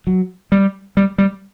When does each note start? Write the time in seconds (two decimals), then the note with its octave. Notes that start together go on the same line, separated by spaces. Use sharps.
0.07 F#3
0.52 G3
0.97 G3
1.18 G3